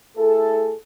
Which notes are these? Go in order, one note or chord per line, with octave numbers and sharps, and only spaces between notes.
A3 E4 G#4 A4